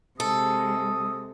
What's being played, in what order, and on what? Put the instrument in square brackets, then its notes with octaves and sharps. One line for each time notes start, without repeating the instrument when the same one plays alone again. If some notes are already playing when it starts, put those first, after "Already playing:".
[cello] C3 G#3 [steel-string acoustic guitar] A4 [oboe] D#6